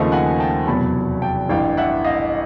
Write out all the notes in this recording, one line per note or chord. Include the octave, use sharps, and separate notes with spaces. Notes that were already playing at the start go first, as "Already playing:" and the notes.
Already playing: D#2 C#3 F3 A3 C4 D#5 F5
F#5 G#5
G5 A5
F1 E2 B2 F#3 A5 B5
G5 A5
A1 G2 E3 F5 G5
E5 F#5
D#5 F5